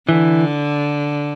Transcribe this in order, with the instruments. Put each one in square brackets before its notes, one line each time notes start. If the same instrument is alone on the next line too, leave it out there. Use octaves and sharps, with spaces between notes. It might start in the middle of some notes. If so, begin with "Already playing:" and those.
[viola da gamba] D3 [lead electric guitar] E3